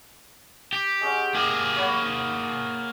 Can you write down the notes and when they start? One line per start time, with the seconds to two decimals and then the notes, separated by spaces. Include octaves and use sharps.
0.73 G4
1.01 G#3 C#4 F#5
1.34 A#3 G4 G#4
1.76 C#5 F#5 B5